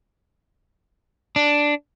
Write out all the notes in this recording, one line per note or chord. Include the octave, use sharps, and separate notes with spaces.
D4